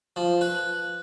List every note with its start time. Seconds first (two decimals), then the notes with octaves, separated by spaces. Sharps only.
0.16 F3
0.41 B4